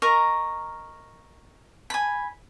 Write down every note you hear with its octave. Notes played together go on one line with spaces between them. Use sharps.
A#4 D#5 A#5 C#6
G#5 B5